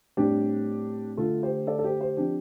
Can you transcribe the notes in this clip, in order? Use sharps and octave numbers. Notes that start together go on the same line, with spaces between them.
A2 G3 C4 D4 G4
D3 A3 D4 F4 A4
G4 C5
A4 D5
A4
G4 C5
G4 C5
F3 C4 D4 G4